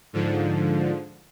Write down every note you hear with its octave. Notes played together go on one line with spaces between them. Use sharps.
G#2 D3 F3